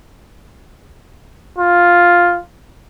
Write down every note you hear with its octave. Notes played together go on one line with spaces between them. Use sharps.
F4